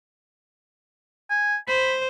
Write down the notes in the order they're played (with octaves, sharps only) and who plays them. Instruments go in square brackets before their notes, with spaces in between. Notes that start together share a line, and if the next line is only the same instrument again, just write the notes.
[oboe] G#5
[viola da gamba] C5 [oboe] B5